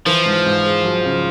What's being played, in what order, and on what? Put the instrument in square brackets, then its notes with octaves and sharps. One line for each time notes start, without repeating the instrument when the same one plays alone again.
[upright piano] E3 [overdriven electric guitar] F3
[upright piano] G#2
G#2
G#3
F#3
C#3